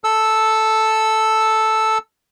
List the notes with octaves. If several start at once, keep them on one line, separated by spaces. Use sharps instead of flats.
A4 E6